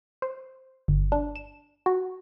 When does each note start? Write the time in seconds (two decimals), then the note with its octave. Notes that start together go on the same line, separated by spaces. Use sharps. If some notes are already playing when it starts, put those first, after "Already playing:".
0.22 C5
0.88 G1
1.12 D4
1.36 E7
1.86 F#4